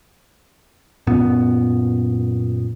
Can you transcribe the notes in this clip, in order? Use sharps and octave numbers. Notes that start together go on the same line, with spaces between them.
F#2 A#2 B3